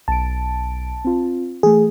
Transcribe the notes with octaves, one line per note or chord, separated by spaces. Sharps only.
B1 A5 D7
C4 F4
E3 A3 G#4